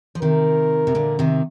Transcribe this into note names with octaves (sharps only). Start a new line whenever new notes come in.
F3
C3 D#3 A#4
C3
A#2 D3
C3 D#3